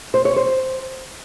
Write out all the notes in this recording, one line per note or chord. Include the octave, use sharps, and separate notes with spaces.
C5
C#5
C5